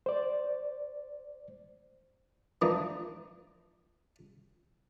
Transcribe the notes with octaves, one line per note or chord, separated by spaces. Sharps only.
C5 D5
E3 F3 A#3 D4 D#4